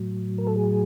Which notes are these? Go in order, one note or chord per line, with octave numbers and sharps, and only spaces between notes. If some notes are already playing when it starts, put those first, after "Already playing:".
Already playing: A2 F#3
A#4
A4
G#4